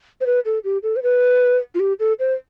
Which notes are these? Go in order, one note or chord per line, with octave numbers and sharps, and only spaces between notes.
C5
B4
A4
G4
A4
C5
B4
F4
G4
A4
C5